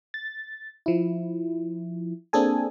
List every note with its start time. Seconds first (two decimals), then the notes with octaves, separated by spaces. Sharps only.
0.14 A6
0.86 F3 E4
2.33 A#3 C4 D4 G#4 A4 G#5